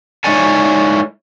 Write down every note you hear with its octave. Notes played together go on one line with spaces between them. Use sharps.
G#3 D#4 E4 C#5 D5 G#5